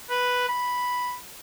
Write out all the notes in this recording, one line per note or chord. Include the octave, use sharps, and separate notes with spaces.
B4
B5